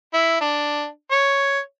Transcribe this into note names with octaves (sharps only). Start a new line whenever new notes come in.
E4
D4
C#5